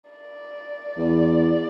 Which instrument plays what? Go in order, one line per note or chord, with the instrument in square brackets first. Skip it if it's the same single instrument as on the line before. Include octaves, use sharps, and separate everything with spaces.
[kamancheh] D5
[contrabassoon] E2